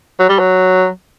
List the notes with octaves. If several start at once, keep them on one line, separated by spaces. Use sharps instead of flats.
F#3
G3
F#3